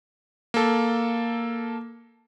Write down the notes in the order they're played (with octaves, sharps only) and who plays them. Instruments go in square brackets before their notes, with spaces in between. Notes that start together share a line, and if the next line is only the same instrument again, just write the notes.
[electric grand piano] A#3 A4